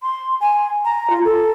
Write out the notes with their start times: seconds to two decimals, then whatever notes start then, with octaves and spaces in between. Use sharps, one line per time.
0.03 C6
0.41 G#5
0.85 A#5
1.10 F4
1.24 A4